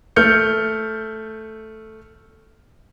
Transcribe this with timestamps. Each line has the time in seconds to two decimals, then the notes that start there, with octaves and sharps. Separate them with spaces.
0.16 A3 F6 G6 C#7